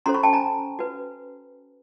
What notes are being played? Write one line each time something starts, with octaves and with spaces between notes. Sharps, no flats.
C#4 F#4 A4 C5 A#5 C6
B5 C#6
G5 A5
G#5 A#5
F#4 B4